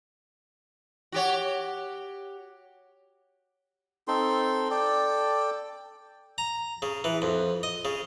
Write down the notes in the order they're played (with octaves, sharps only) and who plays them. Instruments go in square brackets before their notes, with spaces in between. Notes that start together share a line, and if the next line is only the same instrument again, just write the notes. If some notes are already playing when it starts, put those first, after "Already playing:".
[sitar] F#4 G4 C#5
[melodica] C4 D#4 A4 C6
A4 D5 G5
[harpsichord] A#5
C#3
E3
F2
D#5
C#3